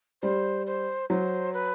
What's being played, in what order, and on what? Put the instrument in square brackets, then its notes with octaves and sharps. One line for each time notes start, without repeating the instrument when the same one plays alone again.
[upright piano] G3 [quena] C5
[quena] C5
[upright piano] F#3 [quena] C5
[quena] B4